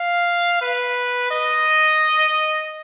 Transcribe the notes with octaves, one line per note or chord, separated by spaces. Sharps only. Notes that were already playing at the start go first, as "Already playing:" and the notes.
Already playing: F5
B4
D#5